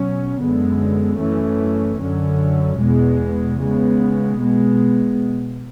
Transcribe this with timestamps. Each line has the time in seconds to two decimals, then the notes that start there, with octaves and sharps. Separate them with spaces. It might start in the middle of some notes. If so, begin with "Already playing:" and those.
Already playing: B2 F#3 C#4
0.40 F#2 D3 G#3 B3
1.19 F#2 E3 A3 C#4
2.00 F#2 D3 F#3 C#4
2.79 E2 B2 G#3 B3
3.59 C#3 G#3 B3
4.39 B2 G#3 B3